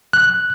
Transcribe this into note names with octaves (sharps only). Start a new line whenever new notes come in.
F#6